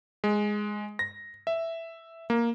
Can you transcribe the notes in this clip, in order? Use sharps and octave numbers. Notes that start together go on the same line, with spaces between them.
G#3
A#6
E5
A#3